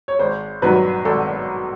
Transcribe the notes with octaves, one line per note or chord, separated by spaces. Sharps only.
C#5
G#1 C5
G2 D#3 F#3 B4
G#1 A4